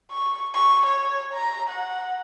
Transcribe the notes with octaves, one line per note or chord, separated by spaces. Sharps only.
C#6
C#6
C#5
A#5
F#5